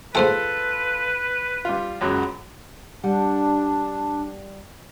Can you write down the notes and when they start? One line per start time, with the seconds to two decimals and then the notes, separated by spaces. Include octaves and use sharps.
0.15 G#2 F4 A4 B4 C5 G5
1.65 G3 F4
2.01 C#2 F#2 F#3
3.04 G3 D4 F#5